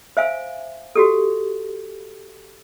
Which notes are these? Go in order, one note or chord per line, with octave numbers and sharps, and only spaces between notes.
C5 E5 F5 G#5
F#4 G4 A4